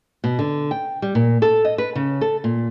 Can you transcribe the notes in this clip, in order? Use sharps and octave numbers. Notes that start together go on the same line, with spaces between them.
B2
D3
G5
G3
A#2
A4
D#5
B4
C#3
A4
A#2